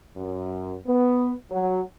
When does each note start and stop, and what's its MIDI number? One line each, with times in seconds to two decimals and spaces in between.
0.16 0.76 42
0.87 1.31 59
1.51 1.80 54